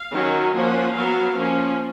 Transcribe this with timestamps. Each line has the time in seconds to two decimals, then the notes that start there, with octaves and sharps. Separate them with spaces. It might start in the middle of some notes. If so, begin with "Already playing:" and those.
Already playing: F5
0.12 D#3 F#3 C#4
0.53 F3 A#3 C#4 F#5
0.94 F#3 B3 F5
1.36 F3 A#3 C#4